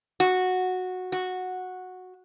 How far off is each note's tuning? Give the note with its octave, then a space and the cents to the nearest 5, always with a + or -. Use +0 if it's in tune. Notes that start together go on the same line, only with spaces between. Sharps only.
F#4 -10
F#4 -10